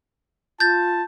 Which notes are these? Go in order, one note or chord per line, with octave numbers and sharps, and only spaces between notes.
F4 A5 G6 A6